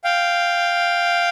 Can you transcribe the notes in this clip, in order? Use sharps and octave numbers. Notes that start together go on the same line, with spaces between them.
F5 G5